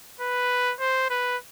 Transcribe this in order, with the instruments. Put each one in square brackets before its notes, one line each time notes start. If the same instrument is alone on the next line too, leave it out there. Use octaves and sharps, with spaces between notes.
[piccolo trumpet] B4
C5
B4